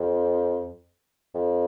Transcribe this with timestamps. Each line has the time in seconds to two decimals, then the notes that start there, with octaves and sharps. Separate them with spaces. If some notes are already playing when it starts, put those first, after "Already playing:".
Already playing: F2
1.35 F2